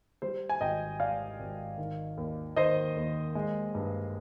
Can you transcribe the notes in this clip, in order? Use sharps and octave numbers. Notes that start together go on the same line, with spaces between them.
G3 C5
G#5
G#1 D#5 G5
G#2 D5 F5
G#1
D#3
D#2
D#3 C5 D#5
D#2
G#3
G2